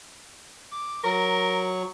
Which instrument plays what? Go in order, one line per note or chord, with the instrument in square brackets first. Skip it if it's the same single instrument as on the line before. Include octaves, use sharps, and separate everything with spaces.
[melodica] D6
[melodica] F#3 C#6 [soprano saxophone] A#4